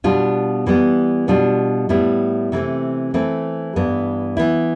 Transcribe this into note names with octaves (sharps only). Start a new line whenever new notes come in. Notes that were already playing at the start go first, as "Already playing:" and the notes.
B2 G3 D4 F4
E3 G3 B3
B2 G3 D4 F4
A2 G3 B3 E4
C3 E3 A3 C4
E3 A3 C4
G2 E3 B3
E3 B3 E4